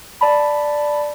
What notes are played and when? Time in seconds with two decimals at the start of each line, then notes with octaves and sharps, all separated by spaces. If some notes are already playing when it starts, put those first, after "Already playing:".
0.21 D5 A5 B5